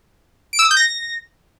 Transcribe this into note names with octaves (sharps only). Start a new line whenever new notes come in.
D7
E6
D#6
G6
A#6